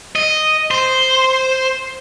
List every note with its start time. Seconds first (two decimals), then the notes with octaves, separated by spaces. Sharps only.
0.16 D#5
0.71 C5